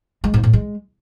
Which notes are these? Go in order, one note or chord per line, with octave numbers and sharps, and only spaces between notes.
G#3
G#2
A2
G#3